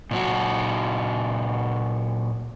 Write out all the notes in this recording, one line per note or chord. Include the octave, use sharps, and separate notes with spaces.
A#2 F#3 F#4